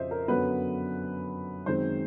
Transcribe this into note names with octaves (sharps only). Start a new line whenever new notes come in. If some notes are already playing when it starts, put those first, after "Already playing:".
Already playing: F2 C#3 C5 D#5 E5
A#4
F#2 D3 F#3 B3 B4
F#2 D#3 G#3 C4 C5